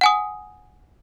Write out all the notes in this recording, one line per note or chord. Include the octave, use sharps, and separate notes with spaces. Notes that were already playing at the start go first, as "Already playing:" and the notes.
F#5 G#5 D#6